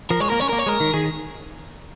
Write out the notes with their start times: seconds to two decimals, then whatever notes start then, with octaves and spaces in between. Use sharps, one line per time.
0.10 F3 A#4
0.20 G#3 C#5
0.30 A#3 A#4
0.40 C#4 C#5
0.49 A#3 A#4
0.59 C#5
0.67 G#3 A#4
0.80 D#3
0.94 D#3 G#4